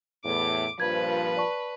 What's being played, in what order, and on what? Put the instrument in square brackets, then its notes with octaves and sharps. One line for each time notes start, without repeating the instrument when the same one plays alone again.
[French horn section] E2 A2 [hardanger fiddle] D6
[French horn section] G2 A#2 F3 [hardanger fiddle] B4 [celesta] G#6
[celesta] D5 A5 C#6